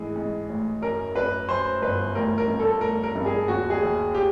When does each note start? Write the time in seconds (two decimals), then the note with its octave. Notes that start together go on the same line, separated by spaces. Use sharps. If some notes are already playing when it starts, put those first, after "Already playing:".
Already playing: G#2 E3 G#4
0.16 G#2
0.49 A1
0.82 F#2 A#4
1.15 F#2 B4
1.48 F#2 C5
1.82 G1 B4
2.15 A1 A#4
2.38 A#4
2.48 G2
2.60 A4
2.81 A1 A#4
3.03 A#4
3.15 G2
3.26 G#4
3.48 D#2 F#4
3.70 G#4
3.82 D#2
4.14 G4